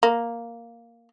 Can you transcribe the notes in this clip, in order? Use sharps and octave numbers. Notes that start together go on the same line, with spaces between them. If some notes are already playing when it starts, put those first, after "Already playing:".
A#3